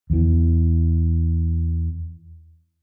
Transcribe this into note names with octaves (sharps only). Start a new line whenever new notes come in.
E2 E3